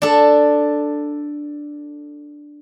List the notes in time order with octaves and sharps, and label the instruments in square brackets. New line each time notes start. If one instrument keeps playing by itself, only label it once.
[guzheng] D4 A4